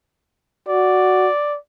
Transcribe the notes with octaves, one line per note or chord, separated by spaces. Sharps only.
F#4 D5